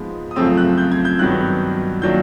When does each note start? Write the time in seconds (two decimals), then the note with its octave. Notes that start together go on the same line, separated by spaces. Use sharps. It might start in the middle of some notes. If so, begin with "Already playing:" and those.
Already playing: G#2 F3 G#3 B3
0.31 D#6
0.36 F#2 C#3 F3 A3 C4 E6
0.57 F#6
0.78 G6
0.92 G#6
1.05 G6
1.19 G2 D#3 F#3 B3 F#6
2.02 D#3 F#3 A#3 D4 G6